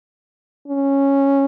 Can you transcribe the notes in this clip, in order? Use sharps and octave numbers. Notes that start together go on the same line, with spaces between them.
C#4